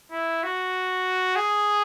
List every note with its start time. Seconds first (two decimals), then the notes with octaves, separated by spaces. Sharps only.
0.12 E4
0.43 F#4
1.35 G#4